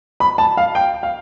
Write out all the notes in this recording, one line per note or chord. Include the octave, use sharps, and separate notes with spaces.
B5
A5
F5
G5
F5